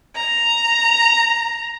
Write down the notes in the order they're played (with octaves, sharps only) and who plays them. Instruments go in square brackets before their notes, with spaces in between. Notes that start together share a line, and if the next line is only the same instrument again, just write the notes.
[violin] A#5